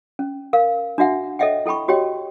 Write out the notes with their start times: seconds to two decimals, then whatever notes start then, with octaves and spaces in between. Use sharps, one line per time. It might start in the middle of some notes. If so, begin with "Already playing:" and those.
0.19 C#4
0.53 A#4 F5
0.98 D4 F#4 E5 F#5
1.39 A4 C#5 D#5 E5 F#5 G5
1.66 E4 A4 G5 B5 C#6
1.88 F#4 G4 C#5 D#5 G5